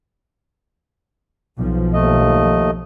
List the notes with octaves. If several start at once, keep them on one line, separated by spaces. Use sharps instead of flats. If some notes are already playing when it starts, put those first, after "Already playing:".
B1 F3
D#2 A3 D#5